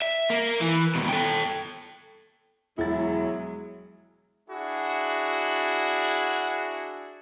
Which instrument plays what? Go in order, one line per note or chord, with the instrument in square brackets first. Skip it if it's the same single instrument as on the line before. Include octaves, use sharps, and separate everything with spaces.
[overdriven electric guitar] E5
A#3
E3
D#2 B2
A4 G5
[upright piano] E1 A6 [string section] F#3 G#3 [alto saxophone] E4
[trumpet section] D4 E4 F#4 G#4